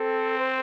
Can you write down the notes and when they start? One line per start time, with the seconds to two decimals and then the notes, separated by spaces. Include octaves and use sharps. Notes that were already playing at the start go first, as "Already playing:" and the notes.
Already playing: C4 A4
0.38 C5